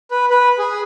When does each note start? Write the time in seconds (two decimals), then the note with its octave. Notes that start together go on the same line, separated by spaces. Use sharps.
0.11 B4
0.30 B4
0.58 G#4